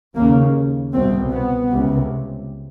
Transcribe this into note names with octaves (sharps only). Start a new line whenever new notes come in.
D#2 C#3 A#3
C2 B2 C4
B3
C#2 C3